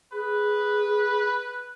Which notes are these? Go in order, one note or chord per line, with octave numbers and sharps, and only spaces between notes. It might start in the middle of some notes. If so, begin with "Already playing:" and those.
G#4 B4